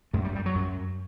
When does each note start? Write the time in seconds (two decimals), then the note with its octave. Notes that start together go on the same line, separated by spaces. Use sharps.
0.13 F#2 A3
0.25 G3
0.35 G3
0.46 F#3
0.55 F#2